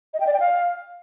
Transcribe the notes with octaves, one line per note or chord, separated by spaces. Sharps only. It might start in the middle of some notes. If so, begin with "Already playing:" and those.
D#5
G5
D5
G5
F5